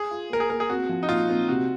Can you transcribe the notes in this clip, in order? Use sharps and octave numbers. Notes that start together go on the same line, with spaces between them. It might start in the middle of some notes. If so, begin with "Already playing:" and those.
Already playing: G#4
F4
A#3 A#4
G#4
A#3 A#4
G#4
C4 F#4
F3
D#4
A#2 F4
C4
C3 F#4